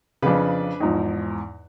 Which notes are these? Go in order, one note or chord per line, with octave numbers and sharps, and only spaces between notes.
F2 C#3 D4 B4
E2 G#2 F3 D#4